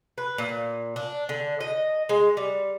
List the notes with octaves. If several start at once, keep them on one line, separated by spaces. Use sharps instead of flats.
B4
A#2
D4
D3
D#5
G#3
G3